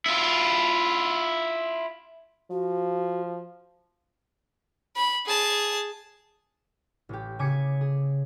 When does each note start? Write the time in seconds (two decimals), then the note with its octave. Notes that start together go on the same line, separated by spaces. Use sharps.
0.06 E4 F4
2.51 F3 F#4
4.96 B5
5.26 G#4 A5
7.09 A1 G4
7.39 C#3 G#5 D6 G#6 B6 C#7
7.81 G#4